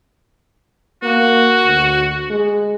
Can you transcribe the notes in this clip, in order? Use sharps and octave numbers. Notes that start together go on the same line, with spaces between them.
A#3 F#4
D2
G#3